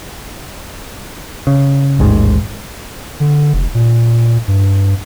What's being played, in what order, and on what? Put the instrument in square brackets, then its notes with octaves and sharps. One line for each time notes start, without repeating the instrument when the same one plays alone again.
[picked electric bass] C#3
A1 D#2 G#2 D#3
[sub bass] D3
F1
A#2
G2